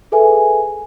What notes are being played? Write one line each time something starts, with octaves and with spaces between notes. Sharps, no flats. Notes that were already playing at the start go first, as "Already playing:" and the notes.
G#4 A4 B4 E5 G#5